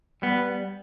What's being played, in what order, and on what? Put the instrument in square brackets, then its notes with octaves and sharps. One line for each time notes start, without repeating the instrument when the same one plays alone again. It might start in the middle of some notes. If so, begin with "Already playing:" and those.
[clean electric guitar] G3 B3